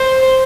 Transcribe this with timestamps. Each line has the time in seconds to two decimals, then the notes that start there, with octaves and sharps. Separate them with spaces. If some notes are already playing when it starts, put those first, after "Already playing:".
Already playing: C5